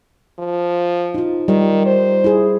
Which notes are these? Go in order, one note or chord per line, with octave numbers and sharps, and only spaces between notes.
F3
D#4 F4
D#3 G3
C5
E4 G#4